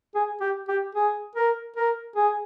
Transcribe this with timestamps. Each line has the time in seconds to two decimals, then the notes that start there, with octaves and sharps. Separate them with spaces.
0.15 G#4
0.41 G4
0.68 G4
0.95 G#4
1.36 A#4
1.76 A#4
2.16 G#4